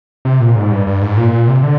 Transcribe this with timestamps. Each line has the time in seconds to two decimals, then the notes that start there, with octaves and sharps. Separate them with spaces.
0.25 C3
0.40 A#2
0.56 G#2
0.71 G2
0.87 G2
1.02 G#2
1.17 A#2
1.33 A#2
1.47 C3
1.63 D3